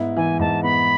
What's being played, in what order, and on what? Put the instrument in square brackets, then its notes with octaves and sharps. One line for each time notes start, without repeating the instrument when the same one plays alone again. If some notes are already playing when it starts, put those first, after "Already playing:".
Already playing: [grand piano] G#2 B3 E4
[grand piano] E3 [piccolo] G#5
[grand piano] G#2 [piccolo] A5
[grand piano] B3 [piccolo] B5